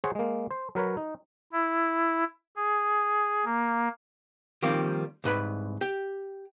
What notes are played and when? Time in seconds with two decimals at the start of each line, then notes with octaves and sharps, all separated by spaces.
0.04 G#4 C5 C#5 F#5
0.15 G#3 A#3
0.51 C5
0.75 F#3 A#4 B4 C#5
0.97 D#4
1.52 E4
2.56 G#4
3.45 A#3
4.62 D#3 F3 G3 A#3 C4
5.24 C2 G#2 B4 B5
5.81 G4